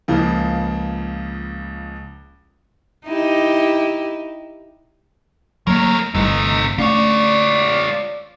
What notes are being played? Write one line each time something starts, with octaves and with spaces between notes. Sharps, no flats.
C#2 C#3 F3 A#3
D#4 E4 G4
F#3 A3 A#3 A#4 C#5 A#5
G1 C3 E3 G3 A3 D#4
A3 C#4 D4 F4 C#5 D5